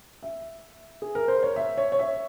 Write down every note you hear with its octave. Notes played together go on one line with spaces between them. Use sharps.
E5
G#4
A#4
C5
C#5
E5
C#5
C#5
E5